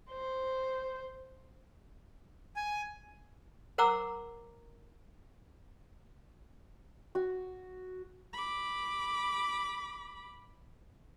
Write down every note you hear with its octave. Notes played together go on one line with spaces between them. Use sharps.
C5
G#5
A#4 C5 F#5 A#5 D6 E6
F#4
B5 D6